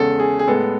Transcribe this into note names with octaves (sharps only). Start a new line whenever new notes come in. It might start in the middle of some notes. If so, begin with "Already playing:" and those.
Already playing: E2 C#3 G#3 A4
G#4
G#4
A2 G#3 B3 A4